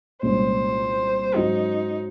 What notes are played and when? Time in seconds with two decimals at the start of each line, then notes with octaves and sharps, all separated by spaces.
0.22 C2 A#2 G#3 C#4 C5
1.36 G#2 F#3 C#4 D#4 F#4